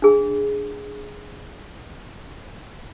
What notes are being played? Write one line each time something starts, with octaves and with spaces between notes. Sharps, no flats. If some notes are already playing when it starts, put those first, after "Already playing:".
D4 G#4